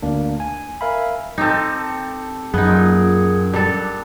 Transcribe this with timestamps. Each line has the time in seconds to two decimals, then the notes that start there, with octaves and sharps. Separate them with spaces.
0.02 D2 A#3 D4
0.40 G#5
0.81 A#4 E5 F5 G#5 B5
1.38 C4 D#4 G4 A4
2.54 F#2 B3 D#4 G#4
2.68 A#2
3.53 G3 D4 A4